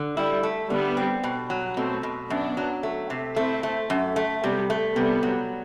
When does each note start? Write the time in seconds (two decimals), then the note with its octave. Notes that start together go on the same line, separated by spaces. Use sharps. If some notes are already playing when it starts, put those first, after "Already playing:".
Already playing: D3
0.17 G3 E4
0.43 A3
0.70 D3 G3 B3
0.97 C4
1.23 B2
1.50 F#3
1.77 B2 A3 C4
2.03 B2
2.30 F#2 B3 D4
2.57 F#3
2.83 A3
3.10 C3
3.36 A3 C4 E4
3.63 A3
3.90 F#2
4.16 A3
4.43 C3 G3 B3
4.70 A3
4.96 C3 G3 B3
5.23 F#3